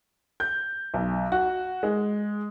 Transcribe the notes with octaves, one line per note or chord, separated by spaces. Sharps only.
G6
B1
F#4
G#3